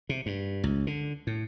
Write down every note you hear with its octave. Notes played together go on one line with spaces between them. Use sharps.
C3
G2
C#2
D3
A2